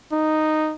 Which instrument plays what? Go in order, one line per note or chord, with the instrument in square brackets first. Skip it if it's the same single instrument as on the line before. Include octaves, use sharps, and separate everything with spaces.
[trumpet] D#4